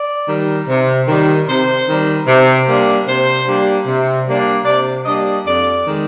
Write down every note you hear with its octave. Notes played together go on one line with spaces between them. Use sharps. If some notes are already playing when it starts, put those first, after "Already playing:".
Already playing: D5
D#3 G3
C3
D#3 G3
C3 C5
D#3 G3
C3
G3 A#3 D4
C3 C5
G3 A#3 D4
C3
G3 A#3 D4
C3 D5
G3 A#3 D4 D#5
F2 D5
D#3 G#3